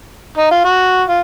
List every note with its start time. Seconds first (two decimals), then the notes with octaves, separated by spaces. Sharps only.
0.37 D#4
0.51 F4
0.65 F#4
1.08 F4